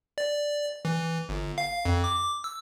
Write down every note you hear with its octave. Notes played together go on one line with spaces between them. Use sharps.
D5
E3
G1
F5
F2
D6
E6